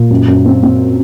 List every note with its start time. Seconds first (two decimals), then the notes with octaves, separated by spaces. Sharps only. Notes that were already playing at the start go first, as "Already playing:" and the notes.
Already playing: A#2
0.10 F#2
0.28 F#2
0.46 C4
0.63 C4